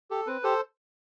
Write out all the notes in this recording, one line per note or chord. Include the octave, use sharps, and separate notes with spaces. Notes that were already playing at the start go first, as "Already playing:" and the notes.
G4 A4
C4 B4
G4 A4 C5